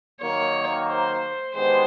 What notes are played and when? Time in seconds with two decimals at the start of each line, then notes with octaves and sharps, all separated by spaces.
0.22 D#3 F#3 A#3 C#5
0.89 C5
1.55 D#3 G#3 B3 D4 G4 C5